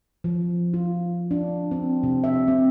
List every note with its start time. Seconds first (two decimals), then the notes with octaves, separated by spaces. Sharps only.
0.24 F3
0.74 F4
1.31 D4
1.71 C4
2.03 C3
2.24 E5
2.48 C4